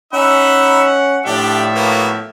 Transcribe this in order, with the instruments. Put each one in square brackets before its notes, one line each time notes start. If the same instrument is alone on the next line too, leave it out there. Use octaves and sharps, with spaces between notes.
[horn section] C#4 F#5 [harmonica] D#4 E5 B5
[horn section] A2 F3 E5 [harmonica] D4 G4
[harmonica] A#3 B3 F#4